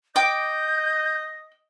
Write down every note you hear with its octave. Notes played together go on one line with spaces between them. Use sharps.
D#5 G5 D6 G6